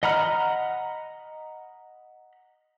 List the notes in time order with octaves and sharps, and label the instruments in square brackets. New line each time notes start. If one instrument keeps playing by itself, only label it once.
[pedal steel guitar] D#5 F#5 A#5 B5 F6